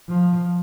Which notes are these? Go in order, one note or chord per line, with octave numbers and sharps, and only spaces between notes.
F3